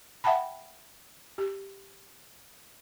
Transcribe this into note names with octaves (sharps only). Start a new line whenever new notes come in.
E5 F#5 G5 A5 B5
G4